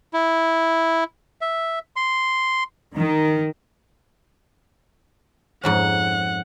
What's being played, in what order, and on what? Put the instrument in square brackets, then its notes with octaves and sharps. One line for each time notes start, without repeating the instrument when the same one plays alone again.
[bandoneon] E4
E5
C6
[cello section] D#3
[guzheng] F2 G#2 C#4 [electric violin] F#5